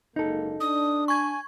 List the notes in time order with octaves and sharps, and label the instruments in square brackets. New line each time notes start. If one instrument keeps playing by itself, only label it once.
[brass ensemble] F#1 G#3 A#3 [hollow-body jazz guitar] D#4 A4
[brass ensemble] D4 [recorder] D#6
[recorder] G#5 [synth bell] C#6 G#6